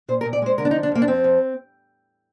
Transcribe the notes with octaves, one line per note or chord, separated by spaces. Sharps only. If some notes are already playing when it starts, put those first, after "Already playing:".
A#2 C5
A#4
A#2
D5
G#3 C5
D3 A#4
D4
D#4
F3
D4
F2 A#3
D4
F3 C4
F2